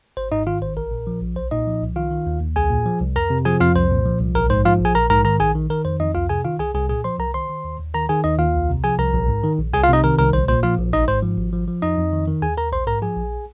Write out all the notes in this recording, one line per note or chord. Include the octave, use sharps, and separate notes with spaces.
G#1 C5
G#2 D#4 D#5
D#3 F4 F5
G#1 C5
A#1 A#4
A#2
F3
A#1
C2 C5
A#2 D#4 D#5
F3
C2
D#3 F4 F5
D#3
D#2
D#2
C2 G#4 G#5
A#2
F3
C2
F2 A#4 A#5
C3
F3 G#4 G#5
F2 F4 F5
C2 C5
A#2
F3
C2
A#1 A#4
G#2 C5
F3 F4 F5
A#1 G#4 G#5
A#1 A#4 A#5
G#2 A#4 A#5
D#3 A#4 A#5
A#1 G#4 G#5
D#3
D#3 A#4
F2 C5
F2 D#4 D#5
C2 F4 F5
C3 G#4 G#5
D#3 F4 F5
C2 G#4 G#5
C2 G#4 G#5
A#2 G#4 G#5
F3 C5 C6
C2 A#4 A#5
D#3 C5 C6
D#3
D#2
D#2
D#3 A#4 A#5
D#3 G#4 G#5
D#2 D#4 D#5
D#2 F4 F5
C2
C3
F3 G#4 G#5
C2 A#4 A#5
A#1
G#2
D#3
A#1
C2 G#4 G#5
F4 F5
C3 D#4 D#5
D#3 A#4
C2 A#4
A#1 C5
A#2 C5
F3 F4 F5
A#1
G#1 D#4 D#5
G#2 C5
F3
G#1
F3
F3
F2 D#4 D#5
F2
D#3
D#3
D#2 G#4 G#5
D#2 A#4 A#5
A#1 C5 C6
G#2 A#4 A#5
F3 G#4 G#5
A#1